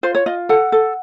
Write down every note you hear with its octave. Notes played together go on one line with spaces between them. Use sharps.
F4 C5
C#5
F4 D#5
A4 F#5
A4